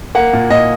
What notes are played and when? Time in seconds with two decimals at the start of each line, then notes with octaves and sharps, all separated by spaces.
0.15 A#3 F#5
0.33 A#2
0.50 A#2 D#5